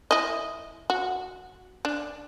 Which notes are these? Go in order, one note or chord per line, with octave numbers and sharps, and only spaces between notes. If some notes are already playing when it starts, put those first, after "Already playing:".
E4 D#5
F#4
D4